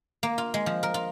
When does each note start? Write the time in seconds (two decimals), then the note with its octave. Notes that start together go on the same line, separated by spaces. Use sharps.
0.23 A#3
0.38 F4
0.54 G#3
0.66 F3
0.83 A#4
0.94 F4